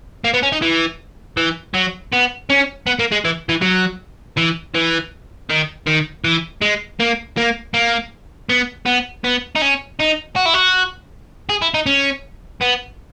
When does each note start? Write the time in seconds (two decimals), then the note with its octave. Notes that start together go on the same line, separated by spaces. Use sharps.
0.24 A#3
0.34 B3
0.43 C#4
0.52 D#4
0.62 E3
1.37 E3
1.74 F#3
2.12 B3
2.50 C#4
2.87 B3
2.99 A#3
3.12 G#3
3.25 E3
3.49 E3
3.62 F#3
4.37 E3
4.74 E3
5.50 D#3
5.87 D#3
6.24 E3
6.62 G#3
7.00 A#3
7.37 A#3
7.74 A#3
8.49 B3
8.86 B3
9.24 B3
9.55 D#4
9.62 C#4
9.99 D#4
10.36 F#4
10.46 E4
10.54 F#4
11.49 G#4
11.62 E4
11.74 D#4
11.86 C#4
12.62 B3